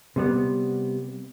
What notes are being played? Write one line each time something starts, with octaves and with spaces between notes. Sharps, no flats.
C3 G3 B3